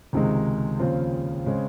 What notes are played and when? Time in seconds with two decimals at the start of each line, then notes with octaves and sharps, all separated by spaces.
0.13 C#2 C3 D#3 G#3 D#4
0.79 D#2 C#3 F3 C4 F4
1.46 C#3 G#3 C4